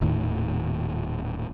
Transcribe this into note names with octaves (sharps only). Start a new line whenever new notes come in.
D#1 D#2 A2 D#3